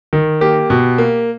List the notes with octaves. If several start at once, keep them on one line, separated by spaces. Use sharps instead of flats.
D#3
A#3 G4
B2
A#3